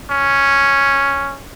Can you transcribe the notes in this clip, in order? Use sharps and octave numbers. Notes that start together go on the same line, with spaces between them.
C#4